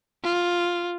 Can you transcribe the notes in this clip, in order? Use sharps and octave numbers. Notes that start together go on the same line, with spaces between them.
F4